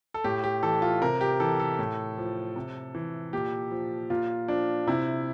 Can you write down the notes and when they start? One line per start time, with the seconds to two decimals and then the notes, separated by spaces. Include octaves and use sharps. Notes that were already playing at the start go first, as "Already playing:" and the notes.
0.14 A4
0.24 A2 G4
0.44 G4
0.63 E3 A4
0.82 F4
1.02 C3 A#4
1.21 G4
1.40 E3 A4
1.60 A4
1.79 A2
2.17 F3
2.56 C3
2.95 E3
3.33 A#2 G4
3.71 F3
4.10 A#2 F4
4.48 F3 D4
4.87 C3 E4